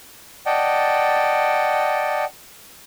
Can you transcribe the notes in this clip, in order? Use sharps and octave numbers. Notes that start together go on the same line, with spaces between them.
D5 D#5 F#5 G5 A5